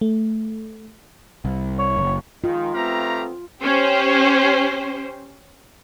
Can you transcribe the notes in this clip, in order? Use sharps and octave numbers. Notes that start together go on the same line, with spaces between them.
A3
C2
C#5
F#1
D#3 G#3 F4
A3 B3 C4 G4 F5 A#5
C#4 G4 C5